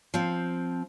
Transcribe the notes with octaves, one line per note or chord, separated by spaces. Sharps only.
F3 C4